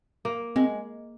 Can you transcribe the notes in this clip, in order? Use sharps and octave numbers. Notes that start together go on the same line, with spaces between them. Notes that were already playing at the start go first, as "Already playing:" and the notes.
A#3
G#3 C4